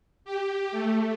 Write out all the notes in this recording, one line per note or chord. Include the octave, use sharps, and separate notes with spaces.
G4
A3